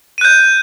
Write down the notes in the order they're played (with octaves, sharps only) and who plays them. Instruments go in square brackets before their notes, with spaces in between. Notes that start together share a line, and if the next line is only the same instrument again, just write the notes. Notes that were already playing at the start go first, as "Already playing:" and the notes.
[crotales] D#7
F#6
G6